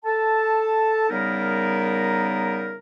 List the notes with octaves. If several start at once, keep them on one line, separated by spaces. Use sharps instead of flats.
A4 A5
C#3 G3 B3 D#4 E4 A#4